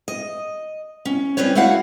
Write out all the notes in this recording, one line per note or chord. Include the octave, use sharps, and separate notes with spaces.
D#5
C#4
G3 C4 C#4 B4 C#5
A3 A#3 E4 F#4 F5 F#5